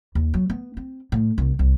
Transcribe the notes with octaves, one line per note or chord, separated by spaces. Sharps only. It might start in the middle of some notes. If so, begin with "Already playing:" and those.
D#2
F#3
B3
C4
A2
C2
C2